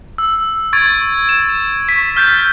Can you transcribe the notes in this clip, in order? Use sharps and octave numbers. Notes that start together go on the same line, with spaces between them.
E6
C#6 G#6 A6 D7
E7
C#6 B6
F6 G6 A6 B6